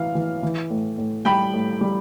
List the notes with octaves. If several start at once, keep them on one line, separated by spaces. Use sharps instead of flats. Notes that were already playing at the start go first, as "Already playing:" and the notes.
Already playing: E3 E4 F5
E3
E3
A2
A2
G3 G5 B5
A2
G3